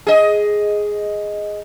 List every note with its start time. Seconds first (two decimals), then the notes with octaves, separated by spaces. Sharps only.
0.07 G#4 D#5